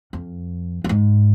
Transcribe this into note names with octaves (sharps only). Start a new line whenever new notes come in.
F2
F2
G#2